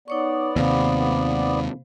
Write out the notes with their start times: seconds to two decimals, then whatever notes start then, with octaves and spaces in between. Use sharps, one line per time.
0.08 B3 D#4 C#5 D5 C#6
0.56 D#2 C3 C5 F5 B5